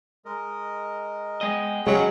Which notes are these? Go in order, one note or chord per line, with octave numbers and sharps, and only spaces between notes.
G#3 A#4 D#5
G#3 B3 G#4 D#5 G5
C#3 F#3 G#3 C#4